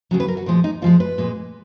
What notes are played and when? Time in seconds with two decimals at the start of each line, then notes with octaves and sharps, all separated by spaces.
0.11 D#2 C#3 F#3
0.20 B4
0.28 A#4
0.37 F#4
0.46 A#2 F3 G#3 F4
0.64 D#4
0.82 A#2 F3 G#3 F4
1.00 B4
1.18 A#2 G#3